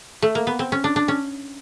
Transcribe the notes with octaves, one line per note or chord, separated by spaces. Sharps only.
A3
A#3
B3
C4
C#4
D4
D4
C#4